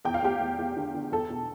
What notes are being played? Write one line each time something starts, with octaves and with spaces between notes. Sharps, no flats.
E2 G5
F5
E2 G4 G5
E2
E2
D3
D3
E2 A4
B2